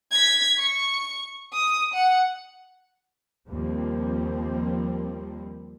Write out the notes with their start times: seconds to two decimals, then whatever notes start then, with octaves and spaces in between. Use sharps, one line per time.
0.11 G#6 B6
0.58 C#6
1.53 D#6
1.93 F#5
3.48 D#2 F3 G3 A#3 C4